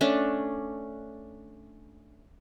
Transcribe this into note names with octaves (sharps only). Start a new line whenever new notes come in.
A3 C#4 D4